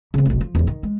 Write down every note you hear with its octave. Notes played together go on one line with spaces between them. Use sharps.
C#3 C4
F1 B1
F3
E2 G#2
D#3
G#3